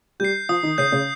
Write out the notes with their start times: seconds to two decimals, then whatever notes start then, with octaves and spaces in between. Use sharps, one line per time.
0.20 G3 G4 G6
0.24 C7
0.49 F3 F4 D#6
0.63 D#3 D#4
0.78 C#3 C#4 G6 C7
0.92 C#3 C#4